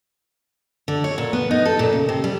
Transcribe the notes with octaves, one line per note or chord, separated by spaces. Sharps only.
D3
C#5
A#2
B3
D#4
A4
A#2
C#3
C3
G3